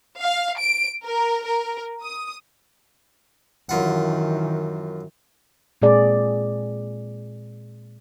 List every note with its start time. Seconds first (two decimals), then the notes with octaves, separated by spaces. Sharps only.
0.20 F5
0.60 D7
1.05 A#4
1.45 A#4
2.03 D#6
3.69 F#2 D#3 E3 F4 F#5
5.82 A#2 G#3 C4 G#4 D5